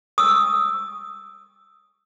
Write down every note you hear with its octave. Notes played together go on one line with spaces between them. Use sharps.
D#6 E6